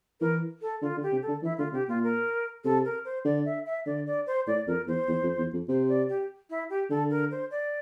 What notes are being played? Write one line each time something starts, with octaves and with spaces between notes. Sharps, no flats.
E3 A#4
A4
D3 F4
D3
G4
C3
A4
D3
E3 E4
D3 F4
C3 G4
A#2 F4
A#4
C3 A4
A#4
C5
D3 D5
E5
E5
D3 D5
D5
C5
A2 D5
F2 A#4
E2 C5
E2
F2
E2
F2
C3 C5
D5
G4
E4
G4
D3 A4
A#4
C5
D5